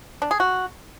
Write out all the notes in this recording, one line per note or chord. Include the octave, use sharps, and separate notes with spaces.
D4
G#4
F#4